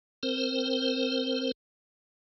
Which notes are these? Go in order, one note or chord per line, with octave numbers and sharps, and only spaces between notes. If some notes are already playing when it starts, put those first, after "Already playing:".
C4 A#4 C5